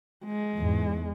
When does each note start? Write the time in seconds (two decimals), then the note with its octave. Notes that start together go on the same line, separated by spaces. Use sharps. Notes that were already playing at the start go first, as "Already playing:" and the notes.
0.25 G#3
0.56 E2 G#2